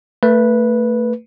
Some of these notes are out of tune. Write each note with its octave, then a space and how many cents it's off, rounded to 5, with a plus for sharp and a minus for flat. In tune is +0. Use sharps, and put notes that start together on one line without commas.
A3 +25 B4 -10